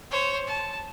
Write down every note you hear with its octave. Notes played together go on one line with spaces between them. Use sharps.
C5 C#5
A5